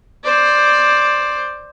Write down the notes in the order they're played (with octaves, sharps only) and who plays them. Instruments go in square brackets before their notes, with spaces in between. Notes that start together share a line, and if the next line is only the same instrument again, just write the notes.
[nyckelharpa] C5 D5